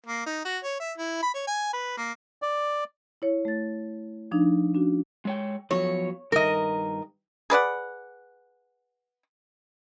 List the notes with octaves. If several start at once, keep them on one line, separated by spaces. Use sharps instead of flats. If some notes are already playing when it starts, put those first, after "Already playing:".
A#3
D#4
F#4
C#5
E5
E4
B5
C#5
G#5
B4
A#3
D5
E4 C#5
A3 A6
F3 D4 D#4
C#4 D4 F#4
G#3 C#5 G5
F3 F#3 B3 C#5
G2 D#3 A#4 D#5
G#4 B4 D5 F#5